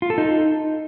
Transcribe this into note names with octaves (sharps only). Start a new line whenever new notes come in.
F4
A4
D#4